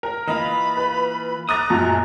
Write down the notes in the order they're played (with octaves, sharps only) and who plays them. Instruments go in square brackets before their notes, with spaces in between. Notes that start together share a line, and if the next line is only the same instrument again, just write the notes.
[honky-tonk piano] A#4
[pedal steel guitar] E3 A#3 F4 [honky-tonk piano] D#5 [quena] B5
[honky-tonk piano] B4
[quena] A#5 [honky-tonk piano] D6 F#6 A6 [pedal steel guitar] D#6
[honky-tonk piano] F#2 A#2 [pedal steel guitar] G#3